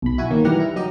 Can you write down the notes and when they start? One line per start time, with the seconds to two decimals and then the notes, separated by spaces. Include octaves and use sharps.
0.02 B1 B5
0.18 E4 F#4 G#5
0.31 D#3 F#3 A#3
0.44 E3 G3 G4 F#5 A#5 F6
0.60 E4
0.76 F#3 D#4 G4 D#5